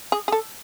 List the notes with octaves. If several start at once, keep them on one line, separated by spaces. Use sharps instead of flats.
G#4
G#4
A4